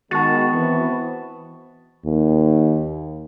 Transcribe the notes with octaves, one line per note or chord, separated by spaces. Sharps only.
D#3 G#3 B3 F#4 A5 C#6 A6
E3 C4
D#2